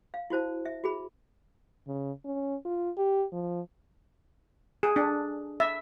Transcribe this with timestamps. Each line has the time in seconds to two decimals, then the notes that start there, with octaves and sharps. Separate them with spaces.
0.14 F5
0.30 E4 F#4 C5 A5
0.65 E5
0.84 F#4 G#4 B5
1.88 C#3
2.25 C#4
2.65 F4
2.98 G4
3.32 F3
4.83 G#4
4.96 D4
5.60 E5